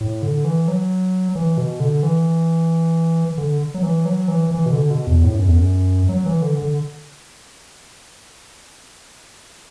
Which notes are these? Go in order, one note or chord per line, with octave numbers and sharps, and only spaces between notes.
A2
D3
E3
F#3
E3
B2
D3
E3
D3
F#3
E3
F#3
E3
E3
B2
D3
B2
E2
A2
F#2
E2
F#2
F#3
E3
D3
D3